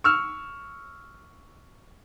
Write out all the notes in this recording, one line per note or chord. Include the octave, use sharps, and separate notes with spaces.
C#6 E6 F6